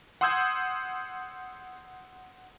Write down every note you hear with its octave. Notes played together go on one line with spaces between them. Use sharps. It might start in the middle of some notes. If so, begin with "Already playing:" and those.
F#5 C6 D#6 E6 G6 G#6